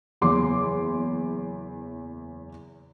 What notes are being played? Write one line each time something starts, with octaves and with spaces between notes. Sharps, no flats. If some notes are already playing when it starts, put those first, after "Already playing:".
F#1 E2 C6 D6